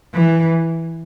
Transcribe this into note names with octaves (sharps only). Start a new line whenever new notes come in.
E3